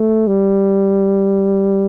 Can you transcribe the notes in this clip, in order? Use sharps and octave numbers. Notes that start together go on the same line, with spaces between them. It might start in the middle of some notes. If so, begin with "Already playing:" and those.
Already playing: A3
G3